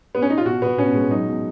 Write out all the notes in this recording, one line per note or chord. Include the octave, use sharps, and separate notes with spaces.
B3
C#4
D#4
F4
B2 F#4
B2 B3
B2 C#4
G#3
F#3 D#4
B2